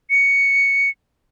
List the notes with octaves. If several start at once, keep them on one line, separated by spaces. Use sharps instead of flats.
C#7